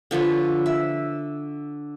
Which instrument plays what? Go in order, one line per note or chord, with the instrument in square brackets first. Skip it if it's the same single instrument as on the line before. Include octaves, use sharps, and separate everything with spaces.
[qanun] D3 F3 B4 C#5
E5